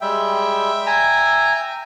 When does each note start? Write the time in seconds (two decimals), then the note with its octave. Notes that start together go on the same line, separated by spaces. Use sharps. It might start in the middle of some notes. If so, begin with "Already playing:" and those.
0.01 G3 G#3 E5 G5
0.86 G#5 A#5